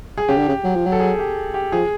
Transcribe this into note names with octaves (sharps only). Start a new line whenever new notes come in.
G#4
C#3 G4
D3
C#3
F#3
F3
F#3
A4
G#4
G4
G4
F3 G#4